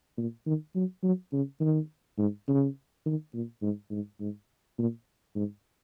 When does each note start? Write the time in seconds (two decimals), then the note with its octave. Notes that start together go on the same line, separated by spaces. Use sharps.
0.18 A#2
0.46 D#3
0.75 F#3
1.03 F#3
1.33 C#3
1.60 D#3
2.18 G#2
2.48 C#3
3.06 D#3
3.34 A#2
3.62 G#2
3.91 G#2
4.20 G#2
4.78 A#2
5.35 G#2